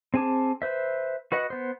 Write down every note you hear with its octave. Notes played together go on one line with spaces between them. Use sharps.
C4 G#4 G#5 A5 D6
B4 C5 E5
F#4 B4 D#5 F#5
B3 C5